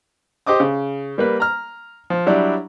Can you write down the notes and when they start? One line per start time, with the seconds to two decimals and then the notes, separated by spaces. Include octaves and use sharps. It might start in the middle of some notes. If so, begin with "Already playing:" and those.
0.47 G4 C5 D#5 D6 D#6
0.60 C#3
1.18 G3 A#3 B4
1.40 A#5 F6
2.10 F3
2.27 F#3 G3 D4 E4